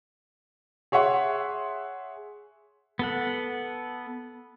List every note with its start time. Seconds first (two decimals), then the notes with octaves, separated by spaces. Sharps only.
0.92 G#4 C#5 E5 F#5 C6
2.99 B3 A4 F#5